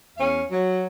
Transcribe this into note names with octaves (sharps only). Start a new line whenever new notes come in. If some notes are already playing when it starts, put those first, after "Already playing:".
E2 C#4 F5
F#3